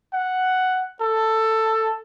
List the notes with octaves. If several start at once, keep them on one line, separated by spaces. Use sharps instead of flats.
F#5
A4